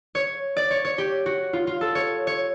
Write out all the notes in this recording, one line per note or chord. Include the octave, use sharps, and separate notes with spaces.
C#5
D5
C#5
C#5
G4
F#4
F4
F4
A4
C#5
C#5